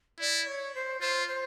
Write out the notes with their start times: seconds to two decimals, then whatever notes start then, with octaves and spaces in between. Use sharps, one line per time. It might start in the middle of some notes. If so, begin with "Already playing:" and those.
0.20 E4 D5
0.47 C#5
0.75 C5
1.01 F4 C5
1.28 C5